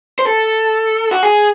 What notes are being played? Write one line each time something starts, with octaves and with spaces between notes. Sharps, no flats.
C5
A4
F#4
G#4